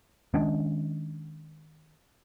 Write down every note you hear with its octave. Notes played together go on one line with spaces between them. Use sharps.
D#3 G#3 C#4 D4